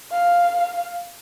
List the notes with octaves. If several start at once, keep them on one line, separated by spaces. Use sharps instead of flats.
F5